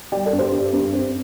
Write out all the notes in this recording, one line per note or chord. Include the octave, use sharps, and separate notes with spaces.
G3 D5 G5
A4 D5
G2
G4 C5
G2 G4
G2
C4